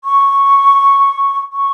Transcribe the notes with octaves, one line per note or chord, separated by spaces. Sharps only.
C#6
C#6